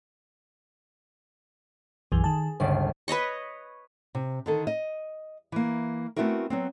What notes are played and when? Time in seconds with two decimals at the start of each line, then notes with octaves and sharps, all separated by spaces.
2.12 B1 F#2 E3 G#4
2.24 D#3 A5
2.60 G1 C#2 C5 D5
3.08 B4 C#5 D#5 C#6
4.15 C3
4.46 D3 D#3 A4
4.67 D#5
5.52 E3 A#3
6.16 A3 B3 C4 E4 F#4 A#4
6.50 F#3 B3 C4